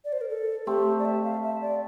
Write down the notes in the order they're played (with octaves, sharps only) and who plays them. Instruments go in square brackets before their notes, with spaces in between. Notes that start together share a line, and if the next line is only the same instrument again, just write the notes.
[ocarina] D5
C5
A#4
A4
[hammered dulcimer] A3 C4 [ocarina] G4
[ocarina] D5
E5
F5
E5
D5